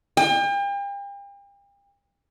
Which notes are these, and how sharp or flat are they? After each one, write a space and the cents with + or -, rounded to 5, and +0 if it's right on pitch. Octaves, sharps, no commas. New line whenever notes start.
G5 +40